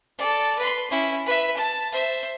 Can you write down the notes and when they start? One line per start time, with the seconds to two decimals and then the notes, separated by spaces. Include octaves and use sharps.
0.18 A4 D5
0.58 B4 C6
0.90 C#4 E4
1.26 B4 E5
1.56 A5
1.92 C5 E5